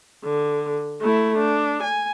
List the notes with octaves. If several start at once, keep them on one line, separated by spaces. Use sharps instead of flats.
D3
A3 E4
D4
G#5